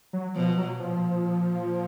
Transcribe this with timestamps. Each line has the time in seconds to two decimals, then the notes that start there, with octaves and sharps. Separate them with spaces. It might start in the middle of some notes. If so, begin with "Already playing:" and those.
0.13 F#3
0.35 B2 F3
0.58 F#3
0.79 A#2 F3